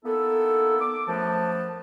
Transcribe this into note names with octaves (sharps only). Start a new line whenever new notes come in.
A#3 B3 D#4 E4 A4
D6
F#2 F3 A3 B3 A5